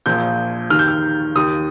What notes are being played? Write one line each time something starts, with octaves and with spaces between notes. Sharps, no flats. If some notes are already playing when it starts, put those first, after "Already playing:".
A#1 A#2 F3 G6
D#2 D#3 F6
G6
F6
D#2 D#3 D#6